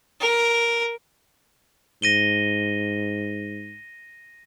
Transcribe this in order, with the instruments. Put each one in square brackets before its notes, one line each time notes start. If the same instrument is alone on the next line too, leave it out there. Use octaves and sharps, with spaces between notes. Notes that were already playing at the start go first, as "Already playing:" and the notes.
[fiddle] A#4
[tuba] G#2 [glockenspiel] A#6 D#7 G7